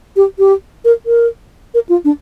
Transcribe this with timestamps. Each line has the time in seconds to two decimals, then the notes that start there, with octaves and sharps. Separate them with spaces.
0.16 G4
0.39 G4
0.85 A#4
1.06 A#4
1.74 A#4
1.89 F4
2.05 D4